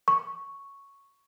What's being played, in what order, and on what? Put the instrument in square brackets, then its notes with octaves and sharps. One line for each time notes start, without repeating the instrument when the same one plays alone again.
[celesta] C#6